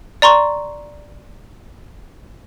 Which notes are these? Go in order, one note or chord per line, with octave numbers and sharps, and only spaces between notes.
D5 A#5 C6 C#6